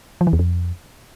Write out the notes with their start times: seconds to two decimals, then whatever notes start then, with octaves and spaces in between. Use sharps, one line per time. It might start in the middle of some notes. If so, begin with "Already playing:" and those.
0.21 F3
0.27 E3
0.33 E2
0.39 F2